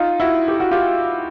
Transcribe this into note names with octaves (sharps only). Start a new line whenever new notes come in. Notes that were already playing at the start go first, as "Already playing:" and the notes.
Already playing: D#4 F4
E4 F#4
G4
F#4
F4 G4